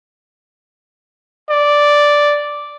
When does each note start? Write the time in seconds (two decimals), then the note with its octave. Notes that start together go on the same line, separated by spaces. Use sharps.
1.50 D5